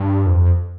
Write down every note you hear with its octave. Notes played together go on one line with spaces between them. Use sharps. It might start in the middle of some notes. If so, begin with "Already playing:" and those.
Already playing: G2
F2